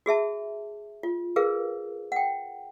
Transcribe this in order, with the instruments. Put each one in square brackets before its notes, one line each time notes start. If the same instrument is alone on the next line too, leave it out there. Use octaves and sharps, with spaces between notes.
[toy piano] F#4 G#4 E5 A5
F4
G#4 A#4 B4 F5
F#5 G5